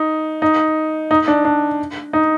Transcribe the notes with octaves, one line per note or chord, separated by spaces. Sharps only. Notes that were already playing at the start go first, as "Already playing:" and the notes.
Already playing: D#4
D#4
D#4
D4
D4
D#4